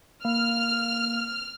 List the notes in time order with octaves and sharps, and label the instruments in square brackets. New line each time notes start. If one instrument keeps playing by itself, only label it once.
[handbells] A#3 [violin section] F6